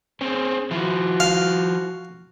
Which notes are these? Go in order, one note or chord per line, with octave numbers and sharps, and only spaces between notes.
C4 C#4 G#4
F3 E4 F#4
F5